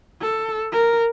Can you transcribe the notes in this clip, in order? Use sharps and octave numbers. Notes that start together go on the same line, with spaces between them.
A4
A#4